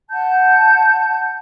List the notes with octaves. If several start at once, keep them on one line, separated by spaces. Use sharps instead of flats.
F#5 A5 G6